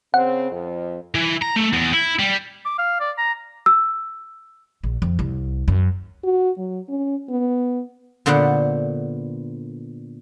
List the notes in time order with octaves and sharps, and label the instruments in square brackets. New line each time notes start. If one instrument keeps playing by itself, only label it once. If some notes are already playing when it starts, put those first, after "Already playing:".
[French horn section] C#3 C4 [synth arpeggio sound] F#5
[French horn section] F2
[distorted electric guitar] E3
A#5
A3
E2
E4
G3
[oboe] D6
F5
D5
A#5
[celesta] E6
[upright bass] A#1
F2
C2
F#2
[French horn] F#4
F#3
C#4
B3
[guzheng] A#2 D3 B3 C5 F#5